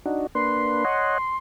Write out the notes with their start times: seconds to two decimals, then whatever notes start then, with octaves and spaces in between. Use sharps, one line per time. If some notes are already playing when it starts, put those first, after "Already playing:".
0.06 D4 D#4 F#4
0.35 A#3 D4 B4 C6
0.85 C#5 D#5 F#5